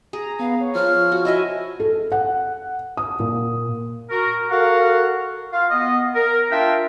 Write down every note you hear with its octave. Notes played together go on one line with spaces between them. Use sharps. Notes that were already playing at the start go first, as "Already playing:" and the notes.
G#4 A#5
B3 F5
C#5
F3 F6
F#4
E4 F#4 D#5 E5 G#5
A4
F#5
D#6
A#2
F#4 A#4
F#4 A4 A#4 F5 F#5
F4 F5
B3 D#5
A#4
D4 F4 E5 F5 G5